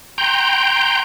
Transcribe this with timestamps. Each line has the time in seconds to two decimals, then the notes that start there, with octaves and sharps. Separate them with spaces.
0.18 G5 A#5 C6 G6